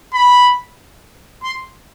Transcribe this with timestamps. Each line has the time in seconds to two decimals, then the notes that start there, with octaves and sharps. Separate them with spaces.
0.14 B5
1.43 C6